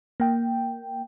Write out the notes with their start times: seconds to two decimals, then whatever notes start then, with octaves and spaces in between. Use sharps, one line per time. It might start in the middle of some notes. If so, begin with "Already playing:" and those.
0.20 A#3 G5